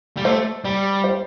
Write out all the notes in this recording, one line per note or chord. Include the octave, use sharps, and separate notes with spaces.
G3
A3 C5
G3 D5
C5